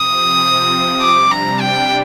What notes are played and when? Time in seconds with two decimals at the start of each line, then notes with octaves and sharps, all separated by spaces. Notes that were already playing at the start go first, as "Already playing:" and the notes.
Already playing: C3 F3 C4 D#6
1.02 C3 G3 D4 D6
1.31 A#5
1.60 G5